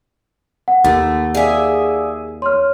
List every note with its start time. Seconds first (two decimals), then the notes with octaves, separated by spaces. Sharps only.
0.68 F#5
0.85 D#2 A3 A6
1.35 G#4 D5 E5 F5 G#5
2.42 C#5 C6 F6